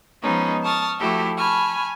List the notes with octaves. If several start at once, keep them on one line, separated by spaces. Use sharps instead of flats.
F3 G#3 B3 C#4 D#4
A5 C#6 D#6 F6 A6
F3 A3 E4 F#4 G4 A4
G#5 A5 B5 C#6 F6